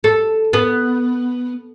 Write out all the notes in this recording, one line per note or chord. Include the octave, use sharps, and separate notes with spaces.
A4
B3